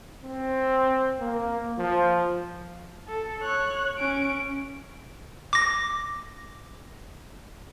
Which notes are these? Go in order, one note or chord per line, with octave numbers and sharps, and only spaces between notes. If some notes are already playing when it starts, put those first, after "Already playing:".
C4
A#3
F3
A4
C#5 F#6
C#4 D7
D6 A#6